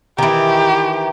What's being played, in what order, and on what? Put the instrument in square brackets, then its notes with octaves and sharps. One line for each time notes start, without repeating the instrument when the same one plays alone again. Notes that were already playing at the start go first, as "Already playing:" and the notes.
[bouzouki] D#3 E3 [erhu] G4